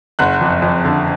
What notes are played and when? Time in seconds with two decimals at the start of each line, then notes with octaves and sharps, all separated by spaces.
0.19 F#1 F#5 F#6
0.41 F2
0.62 F2
0.85 D3